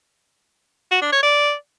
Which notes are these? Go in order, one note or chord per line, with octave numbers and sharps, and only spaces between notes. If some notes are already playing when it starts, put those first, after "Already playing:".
F#4
D4
C#5
D5